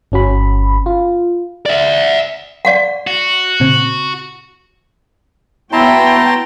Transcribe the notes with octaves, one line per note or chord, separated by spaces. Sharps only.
G1 C#4 F#4 B5
F4
D5 E5
D5 F5 F#5
F#4
A#2 C#3 C4
B3 E4 F#4 C#5 G5 A5 A#5 C6